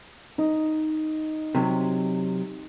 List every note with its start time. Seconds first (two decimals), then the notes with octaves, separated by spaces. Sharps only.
0.38 D#4
1.55 C3 F#3